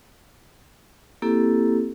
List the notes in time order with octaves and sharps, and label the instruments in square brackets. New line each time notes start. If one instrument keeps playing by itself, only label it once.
[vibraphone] A#3 C4 E4 G4 A4